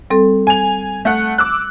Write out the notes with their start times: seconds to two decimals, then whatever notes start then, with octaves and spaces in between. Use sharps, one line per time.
0.10 G3 C4 A4
0.47 G#5 F7
1.05 A3 F#5
1.38 D6 E6 F#6